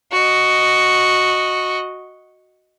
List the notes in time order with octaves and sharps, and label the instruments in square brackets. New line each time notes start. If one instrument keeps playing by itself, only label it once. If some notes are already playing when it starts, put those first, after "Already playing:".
[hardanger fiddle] F#4 D#5